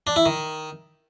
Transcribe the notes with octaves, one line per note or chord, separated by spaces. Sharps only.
D4
E4
D#3